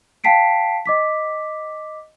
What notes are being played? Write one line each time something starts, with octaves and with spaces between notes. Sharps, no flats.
F5 G5 A5 B6 C7 D7
D#5 D6 B6